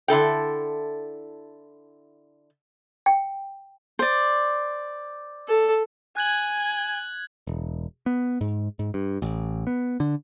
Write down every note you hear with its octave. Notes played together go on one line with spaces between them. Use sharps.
D3 E4 A4 G5
G5
C5 D5
A4
G#5 F#6 G#6 F#7
E1
B3
G#2
G#2
G2
A1
B3
D3